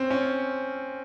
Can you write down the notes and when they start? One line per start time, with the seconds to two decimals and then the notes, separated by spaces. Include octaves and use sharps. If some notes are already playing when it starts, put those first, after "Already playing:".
Already playing: C4 C#4
0.10 C#4